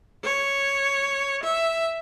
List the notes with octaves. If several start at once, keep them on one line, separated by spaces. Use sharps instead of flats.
C#5
E5